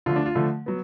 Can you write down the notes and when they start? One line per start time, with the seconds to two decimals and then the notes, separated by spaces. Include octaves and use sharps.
0.06 D3 F3 A3 F4
0.16 D4
0.26 F4
0.35 D3 F3 A3
0.66 F#3 B3